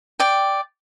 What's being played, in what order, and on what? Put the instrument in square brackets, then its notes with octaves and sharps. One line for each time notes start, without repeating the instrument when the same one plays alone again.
[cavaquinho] D5 G5